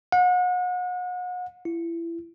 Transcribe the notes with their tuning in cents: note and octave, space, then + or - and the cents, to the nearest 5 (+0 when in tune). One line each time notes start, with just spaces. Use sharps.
F#5 -35
E4 +25